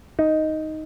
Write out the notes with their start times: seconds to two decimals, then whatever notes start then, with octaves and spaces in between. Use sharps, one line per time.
0.19 D#4